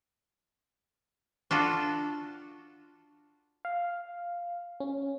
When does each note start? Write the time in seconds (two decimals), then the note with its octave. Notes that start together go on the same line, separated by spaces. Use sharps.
1.51 D4 F4 F#4 A4
3.65 F5
4.80 C#4